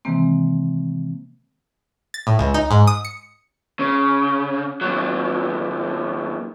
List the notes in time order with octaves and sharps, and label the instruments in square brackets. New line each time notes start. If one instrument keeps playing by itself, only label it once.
[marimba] C3 D#3 E3 G#3 A#3 C4
[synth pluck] A6
A2
C#2
D#4
G#2
D#6
C#7
[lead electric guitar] C#3
D#2 F#3